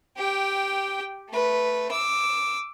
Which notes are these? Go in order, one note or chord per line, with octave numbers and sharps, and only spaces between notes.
G4 G5
A3 B4
D6 E6